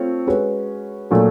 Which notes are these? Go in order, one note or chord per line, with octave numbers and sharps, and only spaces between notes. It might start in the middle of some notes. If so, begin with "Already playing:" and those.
Already playing: A3 C4 F4 C#5
G#3 C#4 F#4 B4
A#2 F#3 A3